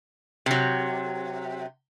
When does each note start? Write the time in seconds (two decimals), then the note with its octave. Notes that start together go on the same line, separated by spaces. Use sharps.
0.46 C3 F#3